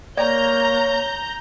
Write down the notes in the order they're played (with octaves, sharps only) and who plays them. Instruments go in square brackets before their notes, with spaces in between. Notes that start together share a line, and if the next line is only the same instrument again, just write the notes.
[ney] A#3 [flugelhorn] C#5 [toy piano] D5 [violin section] A#5 G6